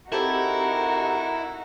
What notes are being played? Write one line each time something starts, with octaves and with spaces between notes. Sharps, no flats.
C4 D#4 E4 F#4 G4 A4 A#4